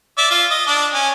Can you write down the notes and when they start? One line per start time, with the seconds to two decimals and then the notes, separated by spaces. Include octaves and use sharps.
0.18 D5 E5
0.30 F4
0.51 D#5
0.67 D4 D5
0.94 C#4